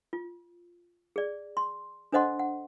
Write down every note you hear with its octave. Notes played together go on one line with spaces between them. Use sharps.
F4
G#4 D5
C6
D4 A4 C5 D#5 F#5 C6
F#5